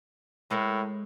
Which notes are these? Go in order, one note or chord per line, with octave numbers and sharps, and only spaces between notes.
A2 G#3 A4 A#4